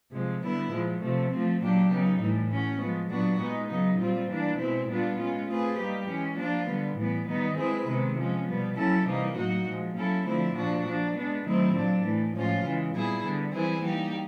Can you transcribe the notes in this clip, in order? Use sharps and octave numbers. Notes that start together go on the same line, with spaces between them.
C3 F3 G#3
D3 G3 B3 E4
A#2 F3 G#3
C3 F3 A3
F3 A3 C4
A#2 F#3 A#3 D4 G4
C#3 F#3 B3 D#4
A2 E3 G3
A3 C#4 F#4
F3 G#3 B3
A#2 F#3 B3 D4 F#4
G#3 B3 D#4
C#3 F#3 B3 D#4
A#2 G3 C4 F4
E3 G3 A#3 D4
B2 G#3 C4 E4
A#2 G3 B3 D4 F4
G#3 C#4 F4
A3 C4 F4 G#4 B4
G3 A#3 D#4 G4
E3 G#3 C#4
F3 A#3 D4 F4
D3 G3 B3
A2 E3 G3 B3
D#3 G3 B3 D#4
G#3 C4 E4 G#4 B4
C3 D#3 G#3 B3
F3 G#3 C#4
B2 G3 B3
F#3 A#3 C#4 E4 A4
C3 E3 G3 A#3 D#4
A2 F#3 A#3 D#4 F#4
A#2 F3 G#3
F#3 A#3 C#4 E4 A4
D3 F3 A3 C4 E4
A#2 F3 A#3 D4 F#4
F3 A#3 D4
G#3 B3 D4
D#3 F#3 A3 C4 E4
A#2 F#3 A#3 D4
A2 E3 A3
A2 F3 G#3 C#4 F4
C#3 E3 G#3
A#2 G3 B3 E4 G#4
D3 G3 B3
E3 G3 C4 E4 G#4
G3 A#3 D#4 G4